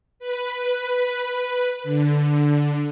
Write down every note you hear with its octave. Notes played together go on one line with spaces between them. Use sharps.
B4
D3